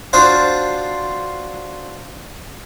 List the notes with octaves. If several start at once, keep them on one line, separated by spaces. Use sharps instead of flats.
D4 F4 F#4 C5 D5